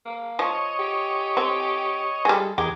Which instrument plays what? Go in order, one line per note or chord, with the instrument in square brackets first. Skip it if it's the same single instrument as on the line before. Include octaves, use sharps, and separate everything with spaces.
[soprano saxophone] A#3
[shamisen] F3 [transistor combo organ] C#5 D#5
[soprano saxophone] G4
[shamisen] C4
[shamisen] G3 G#3 [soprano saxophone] A4
[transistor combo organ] E2 G#4 D#5 [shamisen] G4 [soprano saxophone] A#4